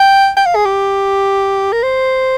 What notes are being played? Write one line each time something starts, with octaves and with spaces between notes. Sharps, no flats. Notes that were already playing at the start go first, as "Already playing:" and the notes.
Already playing: G5
G5
F5
G#4
G4
A#4
C5